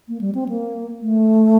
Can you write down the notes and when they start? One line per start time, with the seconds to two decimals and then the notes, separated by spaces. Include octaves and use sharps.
0.08 A#3
0.21 G3
0.35 C4
0.49 A#3
1.01 A3